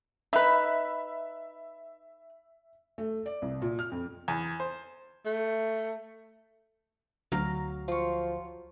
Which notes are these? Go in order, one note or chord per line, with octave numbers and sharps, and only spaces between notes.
D#4 B4 E5 B5
A3
D5
C2
A#2
F6
F2
E2
C5
A3
D2 F#3 F5 A#5
F3 F4 C#6